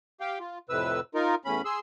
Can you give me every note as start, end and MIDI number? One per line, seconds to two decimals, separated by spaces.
0.20 0.39 67
0.20 0.39 77
0.20 0.39 79
0.40 0.59 65
0.69 1.00 41
0.69 1.00 45
0.69 1.00 48
0.69 1.00 71
0.69 1.00 88
1.14 1.35 63
1.14 1.35 65
1.14 1.35 70
1.45 1.62 40
1.45 1.62 45
1.45 1.62 61
1.45 1.62 83
1.65 1.80 68
1.65 1.80 84
1.65 1.80 88